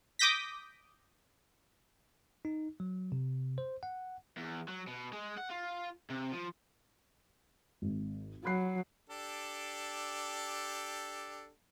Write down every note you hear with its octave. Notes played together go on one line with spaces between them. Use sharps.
D6 D#6 G6 A#6 B6
D#4
F#3
C3
C5
F#5
E2
F#3
B2
G#3
F#5
F4
C3
F3
G#1
F#3 B5 F#6 C7
D4 G4 A4